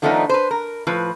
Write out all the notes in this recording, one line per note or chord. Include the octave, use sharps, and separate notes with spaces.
D#3 F3 A3 B3 D4 D#4
B4 C5
A#4
A2 F3 B4